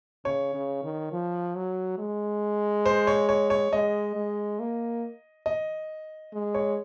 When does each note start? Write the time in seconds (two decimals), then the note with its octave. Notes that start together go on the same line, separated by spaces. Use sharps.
0.25 C#3 C#5
0.54 C#3
0.83 D#3
1.12 F3
1.56 F#3
1.98 G#3
2.86 C5
3.07 C#5
3.29 C#5
3.50 C#5
3.72 G#3 D#5
4.15 G#3
4.59 A#3
5.46 D#5
6.33 G#3
6.54 C#5